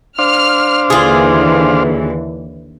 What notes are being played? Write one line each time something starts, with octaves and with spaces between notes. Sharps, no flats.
D4 C5 F5 F6
D#2 D3 E3 F4 G#4